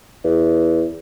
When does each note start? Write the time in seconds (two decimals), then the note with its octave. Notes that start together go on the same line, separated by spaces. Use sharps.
0.24 E2